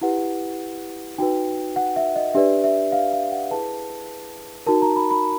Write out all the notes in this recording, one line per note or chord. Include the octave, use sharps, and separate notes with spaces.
E4 G4 B4 F#5
D#4 F#4 B4 G5
F#5
E5
D#5
D4 G4 B4 D5 E5
E5
F5
F5
F#5
E4 G#4 B4 A5
D#4 F#4 A#4 A5
A#5
B5
B5